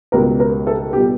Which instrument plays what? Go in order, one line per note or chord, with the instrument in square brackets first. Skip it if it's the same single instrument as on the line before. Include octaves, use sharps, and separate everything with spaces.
[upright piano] C#2 B2 G3 A#4
A#4
A4
B2 G3 G4